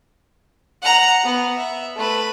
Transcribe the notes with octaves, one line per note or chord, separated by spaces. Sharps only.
F#5 A#5
B3
E5
A3 B4